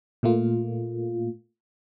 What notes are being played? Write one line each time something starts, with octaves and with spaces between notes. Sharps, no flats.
A#2 A3 A#3 F4